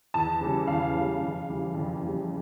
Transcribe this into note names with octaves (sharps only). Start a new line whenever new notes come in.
E2 A5
C#3 E3 G3
E2 F5
C#3 E3 G3
F2
C#3 E3 G3
F2
C#3 E3 G3